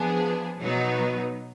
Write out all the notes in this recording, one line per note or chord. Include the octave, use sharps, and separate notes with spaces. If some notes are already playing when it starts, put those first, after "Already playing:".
Already playing: F3 B3 D4 G#4
B2 F#3 B3 D#4